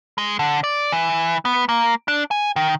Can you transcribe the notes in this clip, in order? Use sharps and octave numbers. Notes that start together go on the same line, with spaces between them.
G#3
D3
D5
E3
B3
A#3
D4
G#5
D#3